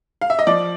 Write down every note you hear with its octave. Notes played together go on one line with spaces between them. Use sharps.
F5
E5
D#5
F3 D5